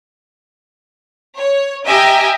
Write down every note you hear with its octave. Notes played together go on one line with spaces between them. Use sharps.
C#5
G4 D#5 E5 G5 G#5 A#5